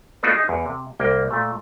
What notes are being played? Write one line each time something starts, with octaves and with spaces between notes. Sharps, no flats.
A3 B3 D4 D#4 F4 F#4
D#4 G#4 E5
E2
C3
C2 A#3 G5
A#2 A3